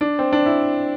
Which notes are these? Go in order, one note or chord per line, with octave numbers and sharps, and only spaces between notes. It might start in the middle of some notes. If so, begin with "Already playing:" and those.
D4
C4
D4
E4